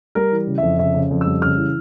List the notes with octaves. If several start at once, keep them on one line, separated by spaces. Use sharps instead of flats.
G3 A#4
E3
C#3
F2 E5
C#3 E5
C#3
F2
E6
G3
C#3 F6
E3